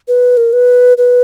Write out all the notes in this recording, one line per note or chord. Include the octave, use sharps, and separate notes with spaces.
B4
A#4
B4
B4